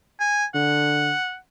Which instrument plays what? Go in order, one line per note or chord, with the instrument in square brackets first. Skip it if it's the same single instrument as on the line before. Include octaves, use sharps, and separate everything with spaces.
[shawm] G#5
[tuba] D3 [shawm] F#5